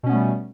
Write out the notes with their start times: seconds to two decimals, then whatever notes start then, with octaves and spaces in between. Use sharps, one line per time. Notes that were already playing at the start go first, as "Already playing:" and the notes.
0.03 B2
0.06 C#4
0.09 B3
0.12 A3
0.15 G3